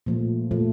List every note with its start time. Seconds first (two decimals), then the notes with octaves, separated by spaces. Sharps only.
0.06 A#2 F3 A3
0.51 A#2 F3 A3